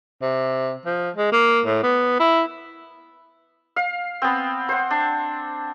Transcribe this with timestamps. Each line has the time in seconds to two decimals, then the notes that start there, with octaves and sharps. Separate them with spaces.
0.22 C3
0.86 F3
1.16 G#3
1.32 A#3
1.66 A2
1.83 B3
2.20 E4
3.76 F5
4.22 B3 C4
4.69 C5 F#5
4.91 D4